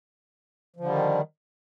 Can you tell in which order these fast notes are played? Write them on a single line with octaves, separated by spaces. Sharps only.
F3 D3 G3 D#3